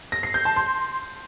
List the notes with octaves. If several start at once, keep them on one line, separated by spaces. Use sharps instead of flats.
A#6
C7
G6
A5
C6